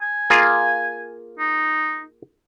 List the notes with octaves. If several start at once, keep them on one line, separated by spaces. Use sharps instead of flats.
G#5
A#3 F4 G#4
D#4